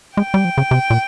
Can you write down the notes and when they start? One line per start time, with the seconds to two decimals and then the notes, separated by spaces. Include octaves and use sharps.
0.17 G#3 G5
0.34 G3
0.45 F3
0.58 C#3
0.71 C3
0.90 A#2